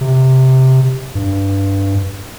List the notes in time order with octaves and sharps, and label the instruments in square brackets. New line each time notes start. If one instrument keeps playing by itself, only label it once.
[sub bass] C3
G2